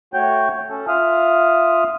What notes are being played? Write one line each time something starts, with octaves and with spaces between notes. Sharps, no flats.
A3 F#4 C#5 G5 G6
C#4 A4
F4 E5 F5 D#6 F6